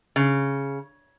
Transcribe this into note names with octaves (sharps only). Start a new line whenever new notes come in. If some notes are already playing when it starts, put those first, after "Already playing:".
C#3